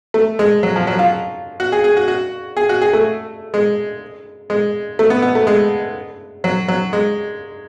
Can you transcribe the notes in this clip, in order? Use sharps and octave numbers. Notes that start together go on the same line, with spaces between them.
A3
G#3
F#3
F3
F#3
F4
F#4
G#4
G#4
F#4
F#4
G#4
F#4
G#4
A3
G#3
G#3
A3
B3
B3
A3
G#3
F#3
F#3
G#3